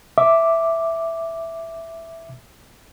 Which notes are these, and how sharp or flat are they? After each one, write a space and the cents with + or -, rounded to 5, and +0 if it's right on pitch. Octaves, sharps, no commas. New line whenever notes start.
E5 +0 D6 +0